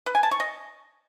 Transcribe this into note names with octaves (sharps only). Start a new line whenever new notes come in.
B4
G#5
A5
C#6
D#5